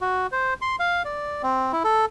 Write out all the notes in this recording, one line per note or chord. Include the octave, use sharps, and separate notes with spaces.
F#4
C5
C6
F5
D5
C4
E4
A4